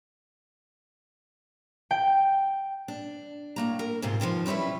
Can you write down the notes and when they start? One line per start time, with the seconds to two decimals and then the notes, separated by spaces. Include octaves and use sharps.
1.91 G5
2.88 D4
3.56 A2 A#3 A#5
3.79 A#4
4.02 G#2 C3 F4
4.20 B2 D3 D#3 F3
4.46 G3 C#4 D#4 E4 B4